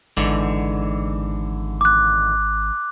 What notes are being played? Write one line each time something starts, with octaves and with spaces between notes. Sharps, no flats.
G#1 G#2 D3 E3
D6 F#6